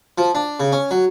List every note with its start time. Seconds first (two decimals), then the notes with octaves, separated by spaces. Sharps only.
0.18 F3
0.35 D4
0.60 C#3
0.72 C#4
0.91 F#3